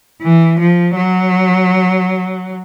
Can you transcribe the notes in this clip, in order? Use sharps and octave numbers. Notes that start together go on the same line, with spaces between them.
E3
F3
F#3